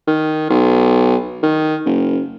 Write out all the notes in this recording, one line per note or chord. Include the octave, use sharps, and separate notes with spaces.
D#3
B1
D#3
F#1